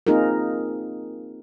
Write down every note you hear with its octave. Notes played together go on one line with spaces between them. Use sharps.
A#3 C4 D#4 F4 G#4 A#4